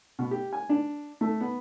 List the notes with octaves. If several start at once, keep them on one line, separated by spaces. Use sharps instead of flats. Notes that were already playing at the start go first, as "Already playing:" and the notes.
B2
G4
G#5
D4
A3
B3